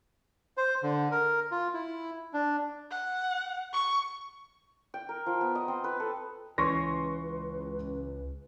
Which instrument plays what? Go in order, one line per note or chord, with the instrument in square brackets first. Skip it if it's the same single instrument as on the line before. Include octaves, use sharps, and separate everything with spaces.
[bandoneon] C5
D3
A#4
F4
E4
D4
[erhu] F#5
C#6
[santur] G5
A#4
F3
B3
D#5
C4
B4
A4
[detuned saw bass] C#2 [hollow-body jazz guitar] E3 C#4 [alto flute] B4 [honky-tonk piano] C6 C#6 A#6